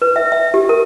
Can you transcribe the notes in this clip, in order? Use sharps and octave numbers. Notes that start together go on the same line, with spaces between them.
B4
E5
E5
G4
A#4